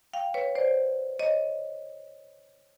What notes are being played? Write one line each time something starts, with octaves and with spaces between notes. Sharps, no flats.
F5 G5
B4 C#5
C5 D5
C#5 D#5